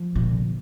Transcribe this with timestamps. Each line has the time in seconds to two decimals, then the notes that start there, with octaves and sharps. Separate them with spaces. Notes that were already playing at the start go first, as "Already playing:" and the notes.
Already playing: F3
0.16 A#2
0.23 D3
0.31 C3
0.40 A#2